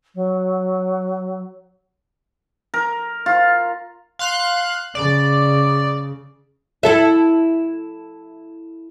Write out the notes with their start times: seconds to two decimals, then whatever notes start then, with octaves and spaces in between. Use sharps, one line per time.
0.15 F#3
2.74 A#4
3.26 F4
4.19 F5 C6 F#6
4.95 C#3 D5
6.83 E4 A4 E5